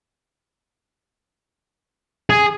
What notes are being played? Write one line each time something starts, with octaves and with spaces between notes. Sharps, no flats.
G#4